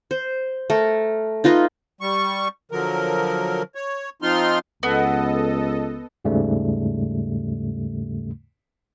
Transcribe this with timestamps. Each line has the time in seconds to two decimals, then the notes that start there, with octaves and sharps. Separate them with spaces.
0.11 C5
0.70 A3 A#4
1.44 D#4 F4 B4 D#5
2.01 G3 C#6
2.71 D3 F3 F#3 A#4
3.75 C#5
4.22 F3 C4 D#4 F4 C6 F6
4.83 C#2 B3 A4 D#5
6.25 D#2 G#2 C#3 G3 A3